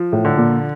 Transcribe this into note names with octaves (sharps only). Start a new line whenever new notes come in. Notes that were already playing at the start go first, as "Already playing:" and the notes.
Already playing: F3
A2
D3
A#2